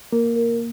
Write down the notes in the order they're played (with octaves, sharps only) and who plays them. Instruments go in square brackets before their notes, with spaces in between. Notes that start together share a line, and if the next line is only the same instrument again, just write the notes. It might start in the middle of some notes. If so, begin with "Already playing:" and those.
[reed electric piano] A#3 [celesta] A#4
[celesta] A#4